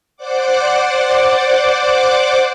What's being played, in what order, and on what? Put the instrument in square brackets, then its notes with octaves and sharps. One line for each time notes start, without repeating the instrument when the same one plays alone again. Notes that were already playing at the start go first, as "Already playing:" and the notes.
[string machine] C5 D5 F#5 D6